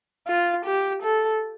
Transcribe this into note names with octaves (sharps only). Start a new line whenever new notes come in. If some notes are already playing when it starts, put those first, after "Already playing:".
F4
G4
A4